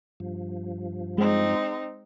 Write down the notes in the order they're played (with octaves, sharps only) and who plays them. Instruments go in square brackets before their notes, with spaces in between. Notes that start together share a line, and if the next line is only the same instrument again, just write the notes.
[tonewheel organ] G2 F3
[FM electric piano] G#3 [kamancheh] C4 D#4